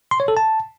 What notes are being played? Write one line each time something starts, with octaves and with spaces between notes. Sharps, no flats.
C6
C#5
A4
A5